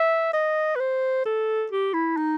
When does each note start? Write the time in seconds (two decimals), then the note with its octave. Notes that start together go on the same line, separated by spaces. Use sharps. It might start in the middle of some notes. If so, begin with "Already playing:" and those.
Already playing: E5
0.33 D#5
0.76 B4
0.80 C5
1.25 A4
1.71 G4
1.94 E4
2.17 D#4